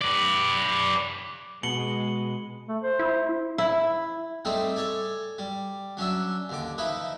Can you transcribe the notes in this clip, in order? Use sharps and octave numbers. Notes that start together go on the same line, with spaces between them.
B4 D5
B2 G#3 C#7 F#7 G7
A3
C5
E4
E4
G3 A3 C4 D#4
A4 C#5 D5 G#5
G3
F#3 C#4 D4 E5
D#2 D3 D6
F3 D#4 E4 B4